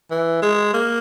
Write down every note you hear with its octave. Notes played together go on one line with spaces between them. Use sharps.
E3
G#3
A#3